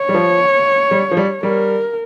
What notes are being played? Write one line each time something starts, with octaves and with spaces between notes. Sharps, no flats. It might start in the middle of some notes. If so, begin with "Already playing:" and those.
Already playing: C#5
G3
F3
G3
F3
G3
G3 A#4